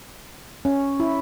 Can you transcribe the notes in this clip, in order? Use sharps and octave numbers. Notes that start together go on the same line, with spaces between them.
C#4
E4